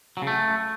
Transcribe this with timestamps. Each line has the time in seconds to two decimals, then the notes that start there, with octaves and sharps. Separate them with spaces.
0.17 F#3
0.22 C#3
0.27 A3